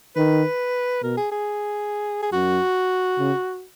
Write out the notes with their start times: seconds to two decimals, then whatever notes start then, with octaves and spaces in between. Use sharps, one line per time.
0.16 D#3 B4
1.03 B2 A#4
1.18 G#4
1.32 G#4
2.23 G#4
2.32 F#2 F#4
3.19 C#3